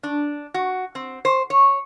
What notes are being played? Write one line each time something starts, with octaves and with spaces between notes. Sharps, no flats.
D4
F#4
C4
C5
C#5